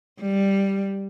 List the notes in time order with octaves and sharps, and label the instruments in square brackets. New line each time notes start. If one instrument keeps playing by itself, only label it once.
[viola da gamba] G3